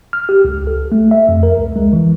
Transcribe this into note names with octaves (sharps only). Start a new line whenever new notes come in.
F6
G4
C#2
A4
A3
E5
F2
A#4
C#2
G#3
E3